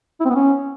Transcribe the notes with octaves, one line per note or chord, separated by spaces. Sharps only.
E4
C4
B3
C#4